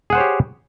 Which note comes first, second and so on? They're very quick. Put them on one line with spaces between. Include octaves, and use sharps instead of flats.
G#4 F#5 C5 C#5 G4